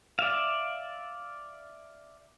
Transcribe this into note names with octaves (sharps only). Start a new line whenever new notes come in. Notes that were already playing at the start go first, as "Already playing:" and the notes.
D5 E5 F5